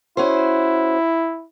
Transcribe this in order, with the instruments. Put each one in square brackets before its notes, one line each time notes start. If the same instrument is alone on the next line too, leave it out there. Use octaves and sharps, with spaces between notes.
[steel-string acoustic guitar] C#4 F#4 C5 [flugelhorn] E4